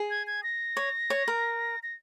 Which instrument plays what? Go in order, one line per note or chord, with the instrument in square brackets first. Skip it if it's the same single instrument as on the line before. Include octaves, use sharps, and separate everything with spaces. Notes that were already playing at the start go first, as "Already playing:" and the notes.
Already playing: [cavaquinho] G#4
[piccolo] G#6
G#6
A#6
[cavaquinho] C#5
C#5
A#4
[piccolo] A#6